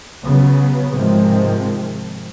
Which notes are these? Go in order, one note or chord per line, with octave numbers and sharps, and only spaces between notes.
C#3 F#3 B3
G#2 C3 D#3 F3 G#3 C4